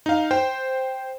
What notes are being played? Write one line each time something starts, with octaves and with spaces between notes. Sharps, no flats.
D#4 F5
C5 G5